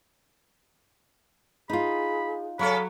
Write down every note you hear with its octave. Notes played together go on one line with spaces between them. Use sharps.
D#4 F4 G#4 B5
C#3 F#3 C#4 A4 F5 B5